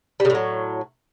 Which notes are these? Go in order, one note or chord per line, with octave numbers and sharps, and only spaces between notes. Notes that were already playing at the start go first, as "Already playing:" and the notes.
A2 C#3 F#3 G3